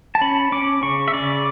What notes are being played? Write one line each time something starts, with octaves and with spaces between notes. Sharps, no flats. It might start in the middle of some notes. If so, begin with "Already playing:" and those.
A5
C#4 B5
C#4 D6
C#3 C#6
E5
C#3 D5